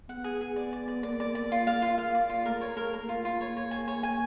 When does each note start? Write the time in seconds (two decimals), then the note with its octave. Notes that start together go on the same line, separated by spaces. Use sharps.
0.09 B3 F#5
0.24 G#4
0.41 G#4
0.56 D5
0.73 D5
0.88 D5
1.03 A#3 D5
1.20 D5
1.35 D5
1.52 F4
1.67 F5
1.82 F4
1.98 F5
2.15 D5
2.29 F4
2.46 A3 A#4
2.61 C#5
2.77 A#4
2.92 A#3 A#4
3.09 F4
3.25 F4
3.41 C#5
3.57 C#5
3.71 G#5
3.88 C#5
4.03 G#5